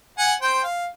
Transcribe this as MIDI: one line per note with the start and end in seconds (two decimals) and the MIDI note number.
0.18 0.33 78
0.18 0.33 80
0.42 0.62 72
0.42 0.62 79
0.42 0.62 84
0.63 0.86 77